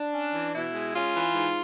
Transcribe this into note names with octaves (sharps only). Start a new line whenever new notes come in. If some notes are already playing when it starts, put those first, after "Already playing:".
Already playing: D4
C#4
E3
B2 E4
G#3
C#4 F4
E3
G#2